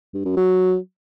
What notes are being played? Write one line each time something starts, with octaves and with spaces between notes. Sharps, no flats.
G2
F#2
F#3